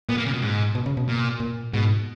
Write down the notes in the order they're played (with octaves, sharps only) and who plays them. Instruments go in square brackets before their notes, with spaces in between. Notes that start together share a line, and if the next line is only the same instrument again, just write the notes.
[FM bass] A#2 [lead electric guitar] B3
[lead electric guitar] A#3
C#3
B2
G#2
[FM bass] B2
C#3
B2
[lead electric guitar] A#2
[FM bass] A#2
[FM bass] G#2 [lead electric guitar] B2